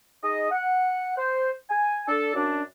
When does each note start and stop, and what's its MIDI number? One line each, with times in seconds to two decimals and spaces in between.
0.23 0.51 63
0.23 0.51 68
0.23 0.51 75
0.51 1.13 78
1.18 1.51 72
1.69 2.03 80
2.08 2.31 62
2.08 2.31 69
2.35 2.62 42
2.35 2.62 62